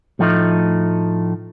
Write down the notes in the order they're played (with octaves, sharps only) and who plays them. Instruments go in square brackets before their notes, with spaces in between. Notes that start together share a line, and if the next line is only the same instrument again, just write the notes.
[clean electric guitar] A2 F3 A3 D#4